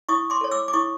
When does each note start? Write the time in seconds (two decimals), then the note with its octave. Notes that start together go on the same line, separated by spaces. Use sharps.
0.09 E4 C#6 D#6
0.30 C6 D6
0.41 A4 C#5
0.51 D6 E6
0.68 D6
0.73 E4 C#6 D#6